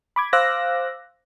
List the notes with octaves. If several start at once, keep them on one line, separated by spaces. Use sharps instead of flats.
B5 D6 G#6
C5 F5 D6 E6 F#6 A#6